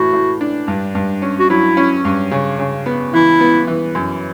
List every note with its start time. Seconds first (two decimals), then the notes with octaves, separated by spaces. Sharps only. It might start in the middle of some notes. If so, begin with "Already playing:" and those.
Already playing: A2 E3 F#4
0.13 A2
0.41 D4
0.68 G2
0.95 G2
1.22 C#4
1.40 F#4
1.50 F#3 E4
1.77 C#4
2.05 G2
2.31 C#3
2.59 C#3
2.86 B3
3.13 E3 E4
3.41 B3
3.67 E3
3.95 F#2